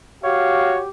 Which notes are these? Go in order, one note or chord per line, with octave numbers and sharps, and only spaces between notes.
F#4 G4 C#5 F5